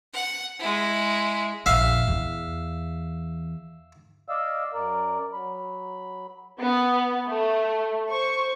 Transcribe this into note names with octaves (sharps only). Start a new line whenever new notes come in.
F#5
G#3 E4
A#1 F2 E5 F5
E2
D5 D#5 F5 E6
F#2 A#4 D5
F#3 B5
B3
A3
C5 C#6